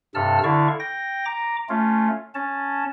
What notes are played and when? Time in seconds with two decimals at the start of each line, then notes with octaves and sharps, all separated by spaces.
0.15 G2 C3 A4 A5 E6 F6
0.44 D3 E4 D5 F5 C#6
0.80 G5 A#6
1.26 A#5 D6
1.69 A3 C#4 F4
2.35 C#4 A5